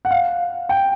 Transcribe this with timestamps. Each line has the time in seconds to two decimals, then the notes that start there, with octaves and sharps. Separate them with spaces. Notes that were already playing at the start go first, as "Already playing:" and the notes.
0.05 F#5
0.11 F5
0.69 G5